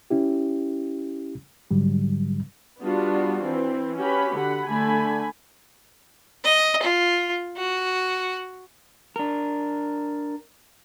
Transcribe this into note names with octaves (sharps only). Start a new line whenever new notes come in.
C#4 E4 G4
G#2 D3 F#3 G3
G3 B3 D4 F4 F#4
E3 C4
C#4 F#4 G4 B4 B5
D3 F#5 B5
D3 A3 G#5 B5
D#5
F4
F#4
D4 A#4